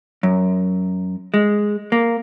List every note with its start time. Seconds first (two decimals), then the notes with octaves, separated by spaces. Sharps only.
0.23 F#2
1.34 G#3
1.92 A#3